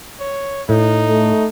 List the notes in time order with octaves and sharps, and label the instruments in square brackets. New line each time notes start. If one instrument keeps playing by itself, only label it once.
[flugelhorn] C#5
[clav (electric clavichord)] A2 [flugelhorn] D#4
[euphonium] A3